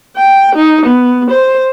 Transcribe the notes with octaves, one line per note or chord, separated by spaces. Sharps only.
G5
D#4
B3
C5